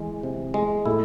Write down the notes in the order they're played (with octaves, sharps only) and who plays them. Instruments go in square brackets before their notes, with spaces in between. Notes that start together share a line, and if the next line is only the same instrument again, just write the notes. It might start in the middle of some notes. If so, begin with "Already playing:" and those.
Already playing: [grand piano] E3 [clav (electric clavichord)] G#3
[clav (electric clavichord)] C3
G#3
[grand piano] A2 A3 [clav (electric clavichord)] E4